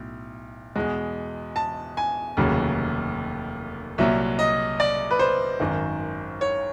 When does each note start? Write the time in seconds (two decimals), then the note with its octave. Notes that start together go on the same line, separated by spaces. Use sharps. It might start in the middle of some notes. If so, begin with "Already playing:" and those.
Already playing: B1 A2
0.76 E2 B2 G#3
1.56 A5
1.97 G#5
2.37 F1 D#2 C#3 F#3
3.98 C2 A#2 F#3 E5
4.39 D#5
4.80 D5
5.11 B4
5.19 C5
5.60 G#1 F#2 D#3
6.41 C#5